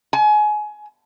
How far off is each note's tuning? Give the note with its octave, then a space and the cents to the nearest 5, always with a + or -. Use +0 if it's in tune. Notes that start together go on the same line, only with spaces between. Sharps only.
G#5 +25